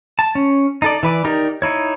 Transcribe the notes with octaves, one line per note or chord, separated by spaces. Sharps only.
A5
C#4
D#4 A4 D5
E3 B4 D5
D#4 G4 A#4 D5
D#4 E4 C#5